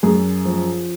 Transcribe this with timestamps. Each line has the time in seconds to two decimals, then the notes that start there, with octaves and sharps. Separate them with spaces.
0.03 F#2 G#4
0.45 F3